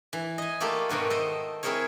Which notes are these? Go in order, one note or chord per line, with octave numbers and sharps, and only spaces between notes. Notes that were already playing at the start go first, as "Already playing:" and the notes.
E3
D#5 G#5
A3 A#3 F4 G4 A4
G#2 B2 D#3 F#4
A4 C5 D#5
C4 E4 G#4 A#4 C5 C#5